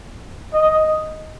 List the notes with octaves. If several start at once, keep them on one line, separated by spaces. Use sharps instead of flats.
D#5